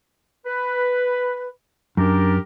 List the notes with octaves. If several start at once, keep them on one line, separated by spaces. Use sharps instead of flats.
B4
F#2 D4 G4 A#4